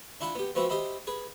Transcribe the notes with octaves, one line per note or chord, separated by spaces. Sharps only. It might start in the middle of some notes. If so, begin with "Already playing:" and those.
D4 E4 F4 F#5 B5
B3 G4
F3 B3 C4 F#4 B4 E5
G4 C5 D#5 E5 B5
G#4 B4